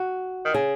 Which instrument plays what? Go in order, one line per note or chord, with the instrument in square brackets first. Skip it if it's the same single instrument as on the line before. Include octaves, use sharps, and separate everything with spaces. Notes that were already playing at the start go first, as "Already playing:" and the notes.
Already playing: [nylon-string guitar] F#4
[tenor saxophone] D#3
[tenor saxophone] C#3 [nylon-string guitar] G#4